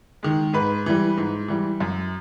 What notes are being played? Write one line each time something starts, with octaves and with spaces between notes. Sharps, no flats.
D#3 G#3
G#2 B4
E3 G3
G#2
E3 G3
F#2